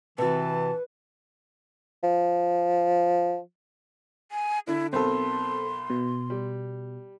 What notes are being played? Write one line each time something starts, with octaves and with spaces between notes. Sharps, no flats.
C3 E3 F#4 B4 A5
F3
G#5
D3 E4
B1 C4 A4 A#4 C6
B2
G3